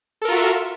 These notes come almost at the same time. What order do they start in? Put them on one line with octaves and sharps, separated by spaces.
A4 A#4 F4 F#4 E5